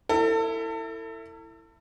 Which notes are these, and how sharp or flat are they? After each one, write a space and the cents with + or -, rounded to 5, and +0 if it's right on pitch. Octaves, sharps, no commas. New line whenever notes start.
E4 +5 A4 +35